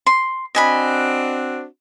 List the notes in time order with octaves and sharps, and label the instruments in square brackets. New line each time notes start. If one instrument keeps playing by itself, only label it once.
[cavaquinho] C6
[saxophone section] C4 D4 F#4 [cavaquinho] D#5 G#5 B5